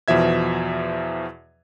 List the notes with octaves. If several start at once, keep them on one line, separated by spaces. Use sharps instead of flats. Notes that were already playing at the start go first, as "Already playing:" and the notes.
E2 B2 F3 E5 G#6